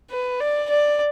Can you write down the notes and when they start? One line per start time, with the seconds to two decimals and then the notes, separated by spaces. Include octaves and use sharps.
0.11 B4
0.41 D5
0.70 D5